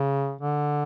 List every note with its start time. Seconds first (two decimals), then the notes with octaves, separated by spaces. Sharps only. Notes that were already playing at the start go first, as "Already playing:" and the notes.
Already playing: C#3
0.41 D3